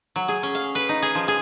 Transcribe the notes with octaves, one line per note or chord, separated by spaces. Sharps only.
F#3
G#4
C#4
F5
B4
D#4
G#4
F3
G#4